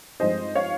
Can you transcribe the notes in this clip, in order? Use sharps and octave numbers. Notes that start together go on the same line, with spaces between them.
G2 F3 G#3 C4 D#4 C5 D#5
C#5 F5